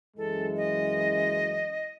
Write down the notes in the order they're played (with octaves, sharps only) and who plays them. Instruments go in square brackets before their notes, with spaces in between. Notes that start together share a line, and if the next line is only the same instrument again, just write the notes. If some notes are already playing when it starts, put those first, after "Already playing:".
[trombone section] F#2 E3 G#3 [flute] A4
[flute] D#5